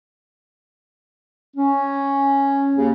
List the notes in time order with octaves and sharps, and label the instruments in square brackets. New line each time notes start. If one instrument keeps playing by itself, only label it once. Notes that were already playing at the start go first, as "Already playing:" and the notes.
[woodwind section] C#4
D#2 C#3